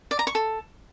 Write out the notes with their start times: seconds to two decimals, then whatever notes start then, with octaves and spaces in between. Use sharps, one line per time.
0.11 D5
0.19 A#5
0.27 C#6
0.35 A4